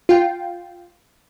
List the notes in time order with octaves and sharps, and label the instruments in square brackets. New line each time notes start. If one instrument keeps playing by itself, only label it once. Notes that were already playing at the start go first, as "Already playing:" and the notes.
[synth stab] F4 G5